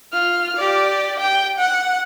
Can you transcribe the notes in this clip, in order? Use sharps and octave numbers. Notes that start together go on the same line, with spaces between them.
F4 F6
G4 D5
G5
F#5